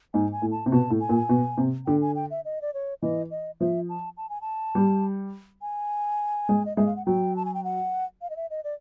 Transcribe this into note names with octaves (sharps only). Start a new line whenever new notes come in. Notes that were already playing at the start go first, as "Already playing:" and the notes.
G#2 G#5
G#5
A2
A5
C3
B2 A5
A2
G#5
A#2
B2
C3
D3 G5
G#5
G5
E5
D#5
D5
C#5
E3 D#5
D#5
F3 E5
A5
A5
G#5
A5
G3
G#5
G#3
D#5
G#3 E5
F5
F#5
F#3 G5
A5
G#5
G5
F#5
F5
D#5
E5
D#5
D5